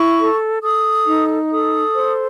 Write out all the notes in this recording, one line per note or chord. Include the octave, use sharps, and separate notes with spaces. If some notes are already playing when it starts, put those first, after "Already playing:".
Already playing: E4 C#6
A4
A4 D#6
D#4
A4 D#6
C5